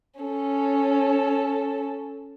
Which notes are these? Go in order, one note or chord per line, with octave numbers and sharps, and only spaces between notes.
C#4 A4